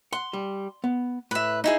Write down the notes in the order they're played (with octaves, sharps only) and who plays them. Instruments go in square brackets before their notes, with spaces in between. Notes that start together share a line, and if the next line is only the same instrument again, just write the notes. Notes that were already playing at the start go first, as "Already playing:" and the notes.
[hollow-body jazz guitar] F#5 [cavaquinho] C6
[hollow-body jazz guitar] G3
B3
[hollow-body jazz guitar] A2 [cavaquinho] B4 E5
[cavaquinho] D#4 E4 G#4